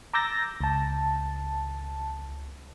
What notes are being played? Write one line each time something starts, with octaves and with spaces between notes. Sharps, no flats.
A#5 D6 E6 G6 A6 A#6
C#2 A5